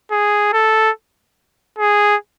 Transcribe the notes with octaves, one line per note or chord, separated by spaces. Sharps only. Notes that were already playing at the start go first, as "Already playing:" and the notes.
G#4
A4
G#4